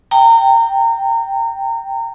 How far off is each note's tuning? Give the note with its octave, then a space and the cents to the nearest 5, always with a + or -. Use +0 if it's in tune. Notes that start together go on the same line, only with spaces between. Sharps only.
G5 +0 A#5 -30